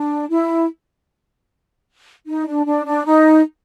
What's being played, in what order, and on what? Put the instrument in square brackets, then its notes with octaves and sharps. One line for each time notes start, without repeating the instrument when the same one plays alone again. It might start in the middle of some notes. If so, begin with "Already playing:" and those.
Already playing: [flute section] D4
E4
D#4
D4
D4
D4
D#4